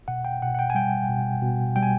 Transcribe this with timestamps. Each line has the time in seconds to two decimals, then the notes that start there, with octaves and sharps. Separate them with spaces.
0.08 B2 F#5
0.25 G5
0.42 B2 F#5
0.54 F#5
0.59 G5
0.70 G#5
0.75 G3 G5
1.09 B2
1.42 B2
1.76 G3 G5
1.83 G#5